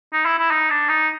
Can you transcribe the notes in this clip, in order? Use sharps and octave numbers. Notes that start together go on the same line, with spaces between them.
D#4
E4
E4
D#4
D4
D#4